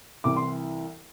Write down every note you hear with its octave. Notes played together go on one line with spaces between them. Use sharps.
C2 C3 E3 D6
C6